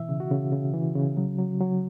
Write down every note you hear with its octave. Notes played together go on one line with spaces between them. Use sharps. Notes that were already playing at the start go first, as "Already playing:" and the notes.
Already playing: B2 E3 E5
C#3
F#4
C#3
C#3
E3
C#3
F#3
F#3
F#3